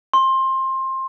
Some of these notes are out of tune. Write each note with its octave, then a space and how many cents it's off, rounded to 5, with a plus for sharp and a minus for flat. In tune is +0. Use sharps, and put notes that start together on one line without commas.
C6 +20